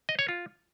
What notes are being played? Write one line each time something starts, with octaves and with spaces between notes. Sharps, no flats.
D#5
C#5
F4